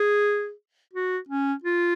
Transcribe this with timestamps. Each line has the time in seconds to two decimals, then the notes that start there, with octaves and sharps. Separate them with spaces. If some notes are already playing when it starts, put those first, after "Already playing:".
Already playing: G#4
0.93 F#4
1.29 C#4
1.64 F4